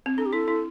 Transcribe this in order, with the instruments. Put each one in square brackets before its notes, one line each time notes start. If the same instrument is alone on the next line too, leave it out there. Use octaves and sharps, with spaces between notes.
[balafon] C4
[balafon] D4 [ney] A4
[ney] G4
[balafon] E4 [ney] A4
[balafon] E4